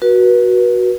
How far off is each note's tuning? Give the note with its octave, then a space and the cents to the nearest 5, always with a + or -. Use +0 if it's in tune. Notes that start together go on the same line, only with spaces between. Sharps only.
F#4 +0 B4 -35